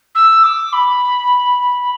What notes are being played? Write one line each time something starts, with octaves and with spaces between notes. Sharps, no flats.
E6
D6
B5